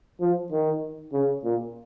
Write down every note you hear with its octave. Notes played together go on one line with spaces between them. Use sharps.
F3
D#3
C#3
A#2